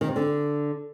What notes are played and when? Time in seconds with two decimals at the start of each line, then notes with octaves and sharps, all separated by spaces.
0.01 D#3
0.08 C3
0.16 D3